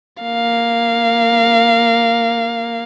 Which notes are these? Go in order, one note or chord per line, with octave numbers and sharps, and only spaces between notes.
A#3 F5